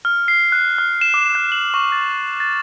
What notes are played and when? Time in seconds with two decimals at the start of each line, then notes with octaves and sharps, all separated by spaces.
0.05 F6
0.28 C7
0.52 F#6
0.78 F6
1.01 E7
1.14 D6
1.35 F#6
1.52 F#7
1.74 C#6
1.92 A6
2.40 A6